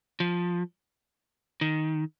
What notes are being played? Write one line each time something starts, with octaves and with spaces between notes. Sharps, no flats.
F3
D#3